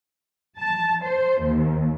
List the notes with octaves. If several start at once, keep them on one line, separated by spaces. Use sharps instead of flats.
A5
C5
D#2